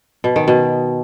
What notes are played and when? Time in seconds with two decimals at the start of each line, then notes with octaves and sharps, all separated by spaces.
0.24 B2
0.36 D#3
0.48 B2